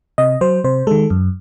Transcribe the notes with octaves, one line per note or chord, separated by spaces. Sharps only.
C3 D#5
F#3 C5
C3 C5
D#3 G#3 A4
F#2